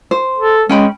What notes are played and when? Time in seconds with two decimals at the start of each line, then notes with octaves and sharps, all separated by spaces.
0.11 C5
0.38 A4
0.69 G#3 C#4 G5 B5